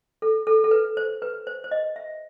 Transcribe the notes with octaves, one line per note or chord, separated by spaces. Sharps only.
A4
A4
A4
B4
C5
B4
C5
C5
D#5
E5